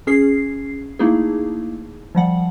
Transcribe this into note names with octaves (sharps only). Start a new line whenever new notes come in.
C#4 G#4 C7
A3 A#3 D#4 E4 G#4
F3 G3 F#5